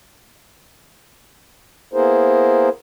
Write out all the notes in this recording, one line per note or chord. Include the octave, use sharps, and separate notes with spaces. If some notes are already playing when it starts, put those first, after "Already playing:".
A#3 B3 E4 G#4 A#4 C5